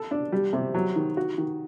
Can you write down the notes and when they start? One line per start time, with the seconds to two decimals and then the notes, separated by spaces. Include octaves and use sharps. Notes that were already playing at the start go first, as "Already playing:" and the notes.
Already playing: A4
0.11 D4
0.32 G3
0.53 C3
0.74 F#3
0.96 D#3
1.17 F#4
1.38 D#3